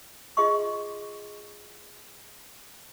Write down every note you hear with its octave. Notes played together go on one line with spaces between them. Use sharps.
F4 G#4 D#5 C6 C#6